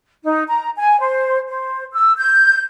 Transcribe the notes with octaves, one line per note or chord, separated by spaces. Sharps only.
D#4
A#5
G#5
C5
C5
E6
G6